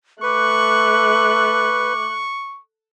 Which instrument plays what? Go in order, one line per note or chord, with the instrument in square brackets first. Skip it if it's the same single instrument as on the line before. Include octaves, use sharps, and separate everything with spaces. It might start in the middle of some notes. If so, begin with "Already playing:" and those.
[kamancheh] A3 F#6 [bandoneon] B4 [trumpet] C#6 [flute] D6